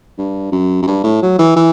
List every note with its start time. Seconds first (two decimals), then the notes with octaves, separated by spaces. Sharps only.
0.18 G2
0.52 F#2
0.82 F#2
0.88 G2
1.04 A2
1.22 F#3
1.39 E3
1.56 E3